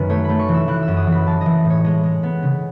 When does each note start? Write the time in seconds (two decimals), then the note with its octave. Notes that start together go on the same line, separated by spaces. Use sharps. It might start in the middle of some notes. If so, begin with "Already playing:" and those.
Already playing: F#2 D#3 B4
0.10 A3 C#5
0.24 A3 B5
0.39 C#6
0.49 E3
0.54 E6
0.68 E3 F#6
0.83 E6
0.88 F#2
0.97 D#6
1.07 E3
1.12 B5
1.26 E3 A5
1.41 E3 D#5
1.65 A2
1.70 C#5
1.84 G#3 D#5
2.03 G#3
2.23 B3
2.43 C#3